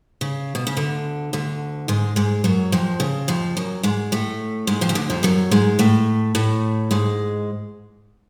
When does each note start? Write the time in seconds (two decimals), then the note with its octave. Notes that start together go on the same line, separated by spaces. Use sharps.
0.21 C#3
0.55 B2
0.67 C#3
0.77 D2 D3
1.33 D2 D3
1.88 G#2 G#3
2.16 G#2 G#3
2.44 F#2 F#3
2.72 F2 F3
3.00 C#3
3.28 F2 F3
3.57 F#2 F#3
3.83 G#2 G#3
4.12 A2 A3
4.67 G#2 G#3
4.81 F2 F3
4.89 C#3
4.95 D2 D3
5.10 F2 F3
5.23 F#2 F#3
5.51 G#2 G#3
5.79 A2 A3
6.35 A2 A3
6.91 G#2 G#3